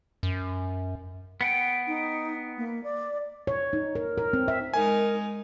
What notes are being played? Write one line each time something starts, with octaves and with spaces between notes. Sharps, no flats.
F#2
B3 F#5 G5
D#4
A#3
D5
C#5
D#4
A#4
A#4
C4
E5
G#3 D#4 A#4 G#5